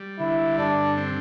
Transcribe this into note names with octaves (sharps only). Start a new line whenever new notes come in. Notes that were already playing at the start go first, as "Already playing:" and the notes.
Already playing: G3
D3 E4
G2 D4
C4